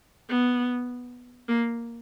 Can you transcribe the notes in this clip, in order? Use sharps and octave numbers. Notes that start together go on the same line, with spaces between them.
B3
A#3